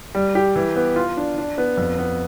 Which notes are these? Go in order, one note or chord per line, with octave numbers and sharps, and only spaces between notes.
G3
G4
E3
B3
F4
D4
D4
B3
F2
B3